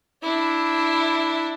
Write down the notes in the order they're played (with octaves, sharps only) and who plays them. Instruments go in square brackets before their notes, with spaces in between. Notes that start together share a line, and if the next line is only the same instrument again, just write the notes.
[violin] D4 E4